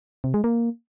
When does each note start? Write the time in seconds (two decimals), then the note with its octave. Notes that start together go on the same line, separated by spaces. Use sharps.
0.24 C3
0.34 G#3
0.44 A#3